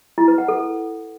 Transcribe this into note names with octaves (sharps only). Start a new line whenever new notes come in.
E4
B4
F#5
A4